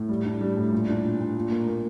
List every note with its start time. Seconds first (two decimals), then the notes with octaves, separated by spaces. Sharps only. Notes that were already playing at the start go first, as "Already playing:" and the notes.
Already playing: A2
0.09 G3
0.24 D4
0.41 G3
0.57 A2
0.72 A#2
0.89 D4
1.04 A#2
1.20 A#2
1.36 A#2
1.51 A#3
1.67 A#3